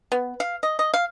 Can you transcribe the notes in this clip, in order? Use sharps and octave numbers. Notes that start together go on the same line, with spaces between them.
B3
F5
D#5
D#5
F5